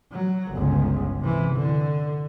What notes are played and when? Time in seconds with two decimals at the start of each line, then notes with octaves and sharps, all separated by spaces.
0.12 F#3
0.52 G1 C#2
1.21 C3 E3
1.55 D3